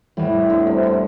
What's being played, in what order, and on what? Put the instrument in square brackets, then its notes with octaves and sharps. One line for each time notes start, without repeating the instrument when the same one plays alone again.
[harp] E2 E3 G3 [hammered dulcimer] A2
[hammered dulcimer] D3
C3
D3